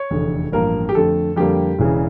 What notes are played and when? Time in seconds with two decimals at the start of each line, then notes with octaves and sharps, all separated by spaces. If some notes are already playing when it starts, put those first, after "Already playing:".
Already playing: C#5
0.11 F1 E2 D3
0.52 A1 G2 F3 A#3 A#4
0.89 G4
0.95 F2 D3 A3 A4
1.36 F2 D3 G3 A#3 G4
1.79 E1 E2 C#3 E3